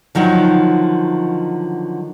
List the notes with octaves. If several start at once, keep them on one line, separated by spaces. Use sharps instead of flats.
D3 D#3 F3 F#3